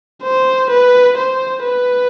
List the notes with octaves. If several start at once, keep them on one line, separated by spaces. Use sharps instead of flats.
C5
B4
C5
B4